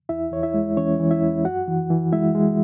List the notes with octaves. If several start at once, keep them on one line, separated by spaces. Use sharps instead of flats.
E2 E4 E5
E2 C#5
E4 E5
G#3
E3 C#4 C#5
E3
E4 E5
E2
F#2 F#4 F#5
E3
E3
G#3 E4 E5
G#3